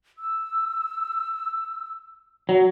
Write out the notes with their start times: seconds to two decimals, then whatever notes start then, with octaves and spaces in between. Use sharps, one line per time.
0.18 E6
2.49 F#3